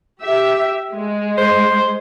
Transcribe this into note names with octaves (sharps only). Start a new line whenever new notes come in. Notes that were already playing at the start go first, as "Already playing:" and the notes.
G4 E5
G#3
C5